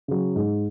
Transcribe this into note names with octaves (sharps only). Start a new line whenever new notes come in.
C#3 F#3
G#2